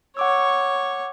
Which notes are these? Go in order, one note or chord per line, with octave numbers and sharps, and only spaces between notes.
C#5 F#5 C#6 D6 E6